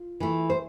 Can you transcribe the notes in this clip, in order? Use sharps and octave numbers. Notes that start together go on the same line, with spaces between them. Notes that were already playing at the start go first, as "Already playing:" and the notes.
Already playing: F4
E3 A3
C5